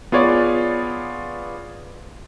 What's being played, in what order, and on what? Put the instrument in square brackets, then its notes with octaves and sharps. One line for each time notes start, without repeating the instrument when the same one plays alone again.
[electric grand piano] B3 F4 G#4 C#5 D5